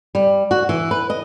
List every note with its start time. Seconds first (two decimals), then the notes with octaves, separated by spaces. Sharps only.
0.15 G3
0.51 F#4
0.69 E3
0.91 B4
1.10 D#5